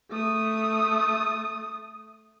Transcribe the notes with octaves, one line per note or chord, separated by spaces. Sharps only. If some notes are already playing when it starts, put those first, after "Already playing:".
A3 D#6